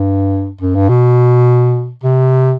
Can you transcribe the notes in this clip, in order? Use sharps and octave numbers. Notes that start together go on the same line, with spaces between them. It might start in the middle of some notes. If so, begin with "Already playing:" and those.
Already playing: G2
F#2
G2
B2
C3